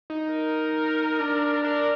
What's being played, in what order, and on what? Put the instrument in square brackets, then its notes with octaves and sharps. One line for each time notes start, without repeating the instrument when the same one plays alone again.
[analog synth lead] D#4
[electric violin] A#4
[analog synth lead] D4
[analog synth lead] D4 [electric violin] A#4